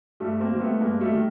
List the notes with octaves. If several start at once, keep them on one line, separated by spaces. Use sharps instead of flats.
G2 G3 A3
A#3 C4
D#3 G3
A3 B3
G2 G#3 A#3
G3 A3
D#3 G3